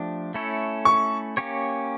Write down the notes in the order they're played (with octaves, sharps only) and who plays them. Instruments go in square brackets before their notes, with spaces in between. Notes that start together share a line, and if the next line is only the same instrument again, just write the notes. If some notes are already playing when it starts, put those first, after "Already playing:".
Already playing: [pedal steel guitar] F3 A3 D4 G4
A3 C#4 E4 A4 C#5
[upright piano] C#6
[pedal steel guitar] A#3 C#4 G4 C#5